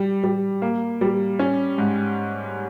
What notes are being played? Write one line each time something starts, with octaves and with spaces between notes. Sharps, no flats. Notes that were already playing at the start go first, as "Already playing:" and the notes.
Already playing: G3
G3
A#3
G3
C#4
G#2